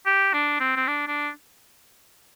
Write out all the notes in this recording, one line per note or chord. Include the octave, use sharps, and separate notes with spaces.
G4
D4
C4
C4
D4
D4